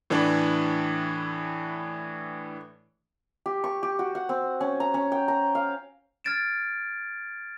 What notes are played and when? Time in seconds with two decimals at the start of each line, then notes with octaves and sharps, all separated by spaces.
0.10 A2 E3 A3 D4
3.46 G4
3.64 C#6
3.83 G4
3.99 F#4
4.15 F#5
4.29 C4
4.61 C#4
4.80 A#5
4.94 C#4
5.12 G5
5.28 A#5
5.55 F5
6.24 F6 G#6 A6 D7 E7